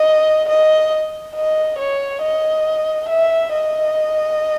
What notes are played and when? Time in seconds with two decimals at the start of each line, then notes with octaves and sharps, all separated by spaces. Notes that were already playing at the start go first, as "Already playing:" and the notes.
Already playing: D#5
0.49 D#5
1.35 D#5
1.79 C#5
2.22 D#5
3.09 E5
3.53 D#5